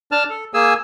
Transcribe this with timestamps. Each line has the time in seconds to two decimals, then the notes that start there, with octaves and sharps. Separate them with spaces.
0.12 D4 A5 F6
0.30 A4
0.54 A#3 G#4 G#5 E6